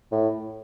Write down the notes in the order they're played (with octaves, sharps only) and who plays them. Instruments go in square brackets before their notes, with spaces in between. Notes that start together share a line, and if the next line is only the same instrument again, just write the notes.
[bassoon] A2